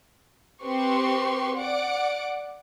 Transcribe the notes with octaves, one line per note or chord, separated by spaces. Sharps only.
C4 G4 B4 C6 C#6
D5 F#5 D6 D7